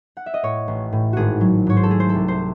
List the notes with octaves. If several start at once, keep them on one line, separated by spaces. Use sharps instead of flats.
F#5
E5
D#5
A2 C#5
A1
A2
G#1 F#4 G#4
F#3
G#2 C#5
C5
A4
A3 G#4
C5
A4
C2
C5